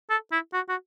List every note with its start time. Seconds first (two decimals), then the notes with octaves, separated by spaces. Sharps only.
0.10 A4
0.32 E4
0.53 F#4
0.69 F#4